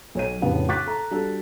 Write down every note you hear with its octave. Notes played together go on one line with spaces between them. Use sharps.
B1 C#5 D#7
F1 A2 C#3 B3 D4 G4
C#6 D6 F#6 A6 B6
A4 A#5
G3 D4 F#4 A4